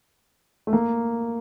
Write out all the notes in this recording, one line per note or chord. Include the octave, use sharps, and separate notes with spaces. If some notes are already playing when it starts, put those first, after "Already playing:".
A3
A#3